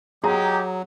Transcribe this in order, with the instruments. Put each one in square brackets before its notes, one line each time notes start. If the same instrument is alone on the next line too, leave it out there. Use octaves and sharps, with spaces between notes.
[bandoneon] F#3 [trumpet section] G#3 G4 [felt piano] G#4 [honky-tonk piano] A#5